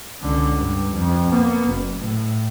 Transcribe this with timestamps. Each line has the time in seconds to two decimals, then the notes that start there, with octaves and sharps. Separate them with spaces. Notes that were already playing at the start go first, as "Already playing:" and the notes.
0.22 C#2 D3
0.56 G2
0.94 F2
1.30 A#3 B3
1.68 F#1
1.99 A2